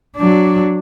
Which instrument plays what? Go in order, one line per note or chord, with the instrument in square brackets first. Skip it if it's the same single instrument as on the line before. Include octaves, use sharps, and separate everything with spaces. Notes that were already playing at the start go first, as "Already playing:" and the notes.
[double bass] F#3 D4